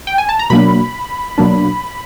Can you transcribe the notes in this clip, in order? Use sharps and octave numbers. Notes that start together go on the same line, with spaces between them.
G5
G#5
A5
A#5
B2 F#3 A#3 D4 B5
B2 F#3 A#3 D4